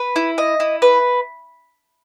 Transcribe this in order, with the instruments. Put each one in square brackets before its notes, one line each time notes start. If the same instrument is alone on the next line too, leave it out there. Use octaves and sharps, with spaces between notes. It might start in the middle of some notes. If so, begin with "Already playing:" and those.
Already playing: [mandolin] B4
E4
D#5
E4
B4